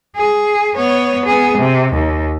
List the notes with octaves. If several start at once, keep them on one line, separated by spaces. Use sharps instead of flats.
G#4
B3 C#5
B3 G#4
C3
D#2